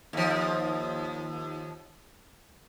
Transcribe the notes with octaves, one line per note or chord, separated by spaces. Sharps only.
D#2 F3